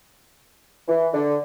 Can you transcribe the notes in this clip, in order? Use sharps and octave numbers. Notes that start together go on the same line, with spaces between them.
E3
D3